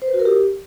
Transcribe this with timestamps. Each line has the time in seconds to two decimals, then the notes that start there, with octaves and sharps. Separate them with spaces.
0.02 C5
0.08 B4
0.14 F#4
0.19 A#4
0.25 G4